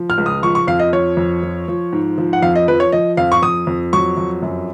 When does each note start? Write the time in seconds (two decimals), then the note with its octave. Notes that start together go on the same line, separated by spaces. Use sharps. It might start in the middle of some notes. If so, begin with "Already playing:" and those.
Already playing: F3
0.10 F6
0.18 C#2
0.26 D#6
0.43 F3 C#6
0.55 C#6
0.67 F2 F5
0.79 D#5
0.93 F3 C#5
1.17 F2
1.43 F3
1.68 F3
1.93 G#2
2.18 F3
2.33 F#5
2.42 F2 F5
2.56 D#5
2.68 F3 B4
2.80 C#5
2.92 F3 D#5
3.17 F2 F5
3.32 C#6
3.42 F2 D#6
3.67 F2
3.93 F#3 C#6
4.17 F2
4.42 F#2